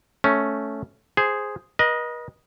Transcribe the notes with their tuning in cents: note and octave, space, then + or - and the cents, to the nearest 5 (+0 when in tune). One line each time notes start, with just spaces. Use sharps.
A3 -5 C#4 +0
G#4 +0 C5 +0
B4 -45 D#5 +0